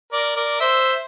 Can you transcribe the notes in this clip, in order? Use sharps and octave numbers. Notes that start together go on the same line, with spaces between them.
A#4 D5
A#4 D5
C5 E5